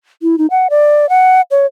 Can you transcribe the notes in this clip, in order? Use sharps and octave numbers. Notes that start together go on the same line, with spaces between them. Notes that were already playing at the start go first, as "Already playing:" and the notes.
E4
D#4
F#5
D5
F#5
C#5